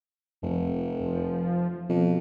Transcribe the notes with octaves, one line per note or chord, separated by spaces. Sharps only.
F1 F2
F3
F2 B2